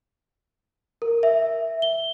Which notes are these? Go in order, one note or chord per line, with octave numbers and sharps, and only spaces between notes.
A#4
E5
G7